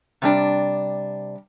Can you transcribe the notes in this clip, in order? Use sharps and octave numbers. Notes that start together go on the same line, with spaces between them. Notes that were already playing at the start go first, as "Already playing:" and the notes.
C3 G3 D4